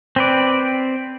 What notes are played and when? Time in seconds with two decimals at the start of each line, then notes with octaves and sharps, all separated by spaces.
0.16 C4 B4 D5